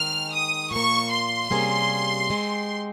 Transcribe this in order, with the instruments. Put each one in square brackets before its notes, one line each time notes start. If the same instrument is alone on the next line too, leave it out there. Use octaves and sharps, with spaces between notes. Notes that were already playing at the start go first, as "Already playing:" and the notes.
Already playing: [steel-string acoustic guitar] D#3 G#3 C4 [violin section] F6
[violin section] D#6
[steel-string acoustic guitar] A#2 F3 A#3 [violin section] C#6
[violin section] C6
[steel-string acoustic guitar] C3 G3 A#3 C#4 G#4
G#3 C4 G4